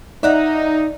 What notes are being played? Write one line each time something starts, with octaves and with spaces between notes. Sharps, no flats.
D#4 D5 E5 F#5 A#5